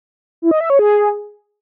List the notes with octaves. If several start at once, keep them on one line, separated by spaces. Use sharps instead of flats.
E4
D#5
E5
C#5
G#4